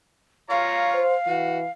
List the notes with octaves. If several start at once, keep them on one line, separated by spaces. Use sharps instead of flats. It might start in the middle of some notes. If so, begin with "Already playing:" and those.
F4 C#5 F5 A#5
C5
E3 F#4